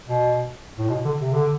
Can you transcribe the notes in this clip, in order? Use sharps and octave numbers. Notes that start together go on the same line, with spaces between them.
B2
A2
B2
D3
C3
D3